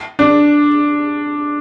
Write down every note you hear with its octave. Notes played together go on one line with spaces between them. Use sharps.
D4